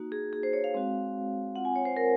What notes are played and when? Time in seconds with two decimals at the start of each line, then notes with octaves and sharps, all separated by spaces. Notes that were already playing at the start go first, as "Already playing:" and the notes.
Already playing: A#3 D#4 F#4
0.12 G#4
0.33 G#4
0.43 C5
0.53 C#5
0.64 F5
0.74 G#3 C4 F#4
1.55 C4 F4 F#5
1.65 G#5
1.76 C#5
1.85 C5
1.97 A#4